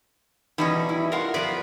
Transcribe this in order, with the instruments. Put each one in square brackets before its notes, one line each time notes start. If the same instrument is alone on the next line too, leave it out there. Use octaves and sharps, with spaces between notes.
[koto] B2 G3 C#4 [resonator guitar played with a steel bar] E3 D#4
[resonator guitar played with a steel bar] E4
[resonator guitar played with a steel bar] A3 F4 F#5 [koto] A#4
[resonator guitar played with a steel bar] F#2 F3 B4 [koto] B3 D5